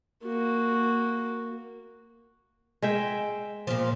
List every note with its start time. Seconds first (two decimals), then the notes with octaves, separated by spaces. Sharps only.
0.23 A#3 F#4
2.82 G#3 E5 G5
3.67 A#2 F3